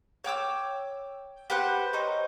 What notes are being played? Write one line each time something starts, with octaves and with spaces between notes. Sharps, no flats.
C#5 G5 D6 E6
G4 B4 C5 F#5
C#4 D#4 C5